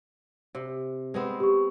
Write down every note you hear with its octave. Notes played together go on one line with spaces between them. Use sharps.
C3
G#3 B3 C4
G4 C#6